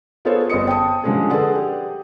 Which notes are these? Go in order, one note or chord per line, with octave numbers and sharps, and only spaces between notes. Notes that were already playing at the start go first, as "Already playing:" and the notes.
B3 F4 G#4 A4 C5 C#5
G1 C4 D#5 D#6 C#7
G5 A5 D#6
D3 F3 G3 G#3 C#4 G#4
G#4 A4 B4 D5 F#5
G4